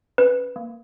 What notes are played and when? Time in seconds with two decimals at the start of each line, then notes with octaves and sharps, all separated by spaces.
0.18 C#4 B4
0.56 A#3